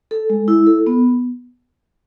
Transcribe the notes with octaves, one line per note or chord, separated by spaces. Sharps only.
A4
G#3
E4
A4
B3